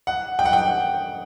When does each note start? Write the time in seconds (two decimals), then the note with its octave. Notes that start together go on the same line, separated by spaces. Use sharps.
0.07 F#5
0.39 G5
0.45 F#5
0.53 G5